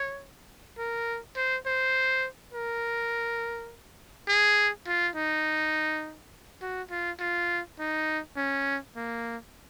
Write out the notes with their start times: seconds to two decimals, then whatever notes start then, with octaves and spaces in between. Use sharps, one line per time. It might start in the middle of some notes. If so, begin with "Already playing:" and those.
Already playing: C#5
0.78 A#4
1.36 C5
1.66 C5
2.53 A#4
4.28 G#4
4.87 F4
5.16 D#4
6.62 F#4
6.90 F4
7.20 F4
7.79 D#4
8.36 C#4
8.96 A#3